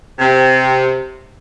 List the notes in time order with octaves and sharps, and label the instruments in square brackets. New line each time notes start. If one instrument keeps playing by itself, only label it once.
[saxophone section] C3